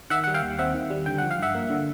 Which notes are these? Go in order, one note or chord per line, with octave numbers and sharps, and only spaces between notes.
D#3 E5 F#5
G3 F#5
F5 G5
D#2
C4 E5 F#5
D#3
G3
D3 G5
F3 F#5
F5
G2 E5 F#5
A#3
D3